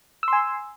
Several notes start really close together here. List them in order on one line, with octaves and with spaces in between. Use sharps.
E6 C6 G#5